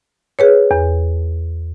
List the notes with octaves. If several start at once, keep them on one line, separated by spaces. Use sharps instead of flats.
G#4 B4 C#5
E2